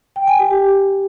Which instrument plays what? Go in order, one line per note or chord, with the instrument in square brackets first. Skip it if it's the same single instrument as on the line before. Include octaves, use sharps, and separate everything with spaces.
[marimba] G5
G#5
G4
G4